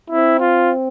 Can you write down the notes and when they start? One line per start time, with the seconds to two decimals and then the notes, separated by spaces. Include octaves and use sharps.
0.10 C4 E4
0.40 F4